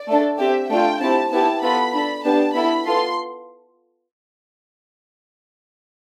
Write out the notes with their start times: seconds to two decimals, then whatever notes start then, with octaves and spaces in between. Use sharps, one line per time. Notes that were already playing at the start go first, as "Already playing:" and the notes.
Already playing: D5
0.08 A3 D4 A4
0.39 C4 G4 E5
0.70 A3 D4 F4 G5
1.00 C4 E4 G4 A5
1.32 B3 E4 G4 A5
1.63 B3 F4 A4 B5
1.94 D4 A4 B5
2.25 B3 D4 G4 A5
2.55 B3 E4 A4 B5
2.86 B3 F4 A4 C6